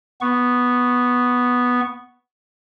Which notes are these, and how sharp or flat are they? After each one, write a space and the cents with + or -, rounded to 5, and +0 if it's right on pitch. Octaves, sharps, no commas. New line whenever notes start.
B3 +0 C#6 +0